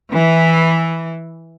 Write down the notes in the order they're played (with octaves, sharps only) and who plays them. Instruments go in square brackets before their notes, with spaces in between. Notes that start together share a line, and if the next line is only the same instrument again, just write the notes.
[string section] E3